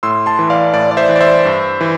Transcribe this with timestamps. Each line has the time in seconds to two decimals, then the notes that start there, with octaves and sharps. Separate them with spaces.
0.03 A2 C6 E6
0.26 A5 C6
0.39 E3
0.50 D5 F5
0.73 A2 D5
0.91 D5
0.97 C5 E5
1.09 E3
1.16 D5
1.21 C5 E5
1.45 G2
1.81 E3